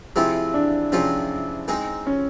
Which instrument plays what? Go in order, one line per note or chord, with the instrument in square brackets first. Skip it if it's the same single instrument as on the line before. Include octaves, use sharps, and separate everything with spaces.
[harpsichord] C3 F3 G#3 C4 F4 [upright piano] E4
[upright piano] D4
[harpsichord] C3 F3 G#3 C4 F4 [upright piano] C#4
[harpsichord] G#3 C4 D#4 G#4
[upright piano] C#4